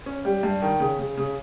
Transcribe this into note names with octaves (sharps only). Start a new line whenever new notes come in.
C#4
G3
G2
D#3
C#3
C#3
C#3